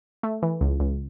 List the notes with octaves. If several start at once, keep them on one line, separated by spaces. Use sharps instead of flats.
A3
E3
C#2
C#2